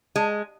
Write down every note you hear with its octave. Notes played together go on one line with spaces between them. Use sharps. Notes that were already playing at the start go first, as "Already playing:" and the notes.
G#3